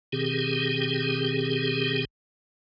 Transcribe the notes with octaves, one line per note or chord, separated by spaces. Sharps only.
B2 D#3 C4 G4 G#4